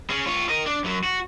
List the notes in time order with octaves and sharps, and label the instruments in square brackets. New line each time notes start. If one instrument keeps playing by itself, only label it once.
[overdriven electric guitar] C#4 G#4
F4 C#5
A#4 D#5
D4
F#2 F#3
F#4